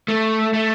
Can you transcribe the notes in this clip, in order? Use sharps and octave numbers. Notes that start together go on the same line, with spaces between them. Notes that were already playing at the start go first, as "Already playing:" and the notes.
A3
A3